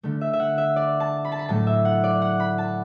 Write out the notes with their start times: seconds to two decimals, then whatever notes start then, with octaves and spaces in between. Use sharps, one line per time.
0.03 D3 A3
0.21 E5
0.33 E5
0.40 F#5
0.58 E5
0.76 D5
1.00 A5
1.25 B5
1.32 A5
1.39 B5
1.49 A2 F#3 A3 A5
1.67 E5
1.85 F#5
2.04 D5
2.22 F#5
2.40 B5
2.58 A5